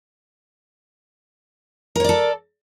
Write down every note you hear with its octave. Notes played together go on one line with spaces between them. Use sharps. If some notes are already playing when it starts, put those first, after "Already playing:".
A4 A#4 C#5 D5